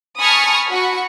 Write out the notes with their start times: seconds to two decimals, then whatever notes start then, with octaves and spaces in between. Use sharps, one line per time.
0.20 G#5 A5 B5 C#6 D#6 F6
0.69 F#4 B5 C#6